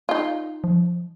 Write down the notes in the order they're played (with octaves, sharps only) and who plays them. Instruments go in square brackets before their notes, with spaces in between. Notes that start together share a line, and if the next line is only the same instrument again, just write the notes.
[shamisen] D#4 F4
[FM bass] F3